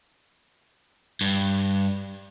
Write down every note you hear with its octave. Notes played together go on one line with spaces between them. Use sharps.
G2